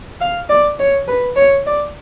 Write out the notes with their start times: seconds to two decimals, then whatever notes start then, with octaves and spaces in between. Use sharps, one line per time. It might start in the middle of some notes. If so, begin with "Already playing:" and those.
0.21 F5
0.50 D5
0.79 C#5
1.08 B4
1.37 C#5
1.66 D5